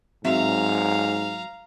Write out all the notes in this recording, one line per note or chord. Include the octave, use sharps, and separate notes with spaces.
G#2 F#3 C4 E5 F5 A#5